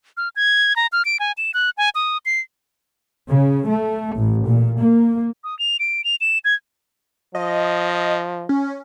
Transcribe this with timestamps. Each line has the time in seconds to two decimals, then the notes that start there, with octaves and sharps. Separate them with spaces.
0.17 F6
0.36 G#6
0.76 A#5
0.92 F6
1.05 D7
1.20 G#5
1.38 E7
1.54 F#6
1.78 G#5
1.95 D#6
2.26 C7
3.30 C#3
3.67 A3
4.16 A1
4.47 A#2
4.80 A#3
5.44 D#6
5.59 F7
5.80 D7
6.04 F7
6.21 E7
6.45 G#6
7.35 F3 D#5
8.49 C#4